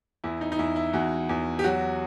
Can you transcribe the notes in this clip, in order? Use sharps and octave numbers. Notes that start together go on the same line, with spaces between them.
E2 E4
D#4
D#4
E2 E4
E4
E2 F#4
E2
G4
F#3 F#4